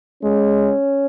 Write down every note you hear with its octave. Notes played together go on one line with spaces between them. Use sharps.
G#3 C#4